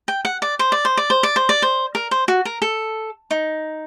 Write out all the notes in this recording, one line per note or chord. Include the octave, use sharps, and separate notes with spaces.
G5
F#5
D5
C5
D5
C5
D5
C5
D5
C5
D5
C5
A#4
C5
F#4
A#4
A4
D#4